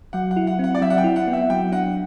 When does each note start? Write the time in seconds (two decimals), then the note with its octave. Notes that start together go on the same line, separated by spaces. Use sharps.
0.13 F#3 F#5
0.31 F#5
0.36 E4
0.47 F#5
0.59 C4 F#5
0.75 D5
0.81 F#3 E5
0.90 F#5
0.98 G5
1.04 E4
1.16 F#5
1.27 B3
1.33 E5
1.50 F#3 G5
1.72 D4 F#5